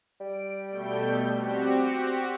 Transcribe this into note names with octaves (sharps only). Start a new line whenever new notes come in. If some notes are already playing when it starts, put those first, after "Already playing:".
G3 D7
B2 A3 G6
C4 F#4 G4